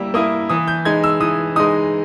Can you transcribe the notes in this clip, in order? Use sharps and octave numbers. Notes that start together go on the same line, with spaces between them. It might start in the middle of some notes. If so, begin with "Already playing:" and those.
Already playing: G3 A#3 E4 E6
A#3 E4 D#6
E3 D#6
G6
G#3 D#4 G#6
E6
E3 D#6
G#3 D#4 D#6